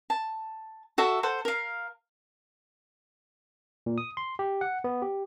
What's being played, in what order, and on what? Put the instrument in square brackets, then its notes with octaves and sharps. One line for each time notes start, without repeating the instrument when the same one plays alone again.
[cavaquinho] A5
F#4 A4 E5 A5
A4 C5 F#5
A#4 F5
[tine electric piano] A#2
D#6
C6
G4
F#5
B3
G4